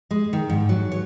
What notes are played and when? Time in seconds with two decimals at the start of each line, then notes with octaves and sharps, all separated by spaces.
0.11 G#3
0.33 D#3
0.50 G#2
0.69 F#3
0.92 C#5